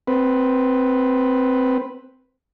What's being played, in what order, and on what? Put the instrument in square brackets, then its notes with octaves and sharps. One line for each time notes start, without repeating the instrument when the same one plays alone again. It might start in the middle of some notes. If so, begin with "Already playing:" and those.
[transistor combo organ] C4 B4